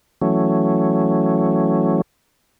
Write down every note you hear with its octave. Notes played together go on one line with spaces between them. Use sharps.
E3 F#3 A3 C#4